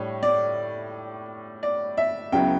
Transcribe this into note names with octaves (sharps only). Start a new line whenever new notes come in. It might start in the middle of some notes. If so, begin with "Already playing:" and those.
Already playing: A2 G3 D4 C#5
D5
D5
E5
C#2 C#3 F#3 B3 E4 G5